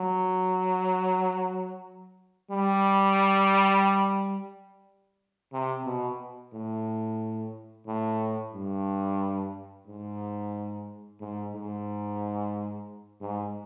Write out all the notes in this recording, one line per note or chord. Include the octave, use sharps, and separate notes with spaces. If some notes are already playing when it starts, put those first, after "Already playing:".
Already playing: F#3
G3
C3
B2
A2
A2
G2
G#2
G#2
G#2
G#2